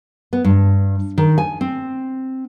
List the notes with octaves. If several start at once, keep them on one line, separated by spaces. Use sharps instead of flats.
B3
G2
D#3
G#5
C4